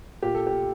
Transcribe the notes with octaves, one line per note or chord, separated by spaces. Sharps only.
A#2 G4
A4
G4